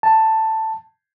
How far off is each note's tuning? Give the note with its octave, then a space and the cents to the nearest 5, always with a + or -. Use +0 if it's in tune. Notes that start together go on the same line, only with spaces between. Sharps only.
A5 +10